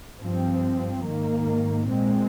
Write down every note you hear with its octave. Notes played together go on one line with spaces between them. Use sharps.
G2 F3 C4
G#2 D#3 A#3
A#2 G#3 C4